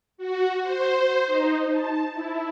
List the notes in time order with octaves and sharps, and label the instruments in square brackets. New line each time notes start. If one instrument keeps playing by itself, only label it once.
[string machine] F#4
C5
D#4
A5
E4